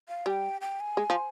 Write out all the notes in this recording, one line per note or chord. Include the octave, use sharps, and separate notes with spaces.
F5
G3 G5 G#5
G5
G#5
G#3
F3